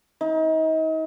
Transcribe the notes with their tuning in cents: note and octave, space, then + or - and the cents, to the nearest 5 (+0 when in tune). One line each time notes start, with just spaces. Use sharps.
D#4 +35